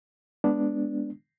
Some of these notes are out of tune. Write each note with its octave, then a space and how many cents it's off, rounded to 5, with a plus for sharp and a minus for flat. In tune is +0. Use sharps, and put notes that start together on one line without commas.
G#3 +0 B3 +0 D4 +0